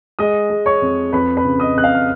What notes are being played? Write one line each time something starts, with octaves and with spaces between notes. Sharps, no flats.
G#3 D#5 D#6
G#3
C#5 C#6
F2
F2 B4 B5
B4 B5
C#3
D#5 D#6
F2 F#6
F5 F6
F6